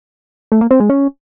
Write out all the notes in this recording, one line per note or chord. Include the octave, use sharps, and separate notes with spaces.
A3
A#3
C4
G#3
C#4